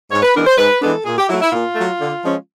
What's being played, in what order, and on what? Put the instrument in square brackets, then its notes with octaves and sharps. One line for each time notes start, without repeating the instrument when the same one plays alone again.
[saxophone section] G#2 C#5
B4
E3 G#3 B3 D4 A#4
C5
G#2 B4
E3 G#3 B3 D4 A4
A#2 G#4
G4
F#3 E4
A3
E4
A#2 F4
F#3 A3
D3
F3 G#3 C#4